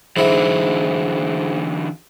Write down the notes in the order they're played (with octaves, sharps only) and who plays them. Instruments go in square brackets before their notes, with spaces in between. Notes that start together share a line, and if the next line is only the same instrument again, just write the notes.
[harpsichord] G#2 E4 [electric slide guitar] D3 E3 F#3